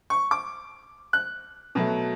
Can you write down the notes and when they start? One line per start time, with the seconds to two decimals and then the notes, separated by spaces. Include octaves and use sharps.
0.10 C#6
0.31 D6
1.13 F#6
1.75 B2 F#3 A3